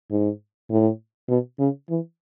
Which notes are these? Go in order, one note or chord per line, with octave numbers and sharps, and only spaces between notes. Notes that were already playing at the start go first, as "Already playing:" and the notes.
G#2
A2
B2
C#3
E3